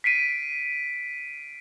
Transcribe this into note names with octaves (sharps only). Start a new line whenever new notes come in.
B6 C7 D7 D#7